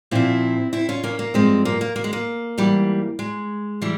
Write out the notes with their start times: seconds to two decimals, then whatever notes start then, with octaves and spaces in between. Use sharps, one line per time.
0.11 A#2 F3 C4 E4
0.73 C4 E4
0.89 C#4 F4
1.03 A#3 C#4
1.19 A#3
1.34 G2 F3 G#3 C4
1.65 A#3
1.81 A#3
1.96 A#3
2.04 G#3
2.13 A#3
2.58 G#2 E3 G3
3.19 G#3
3.82 E3 G3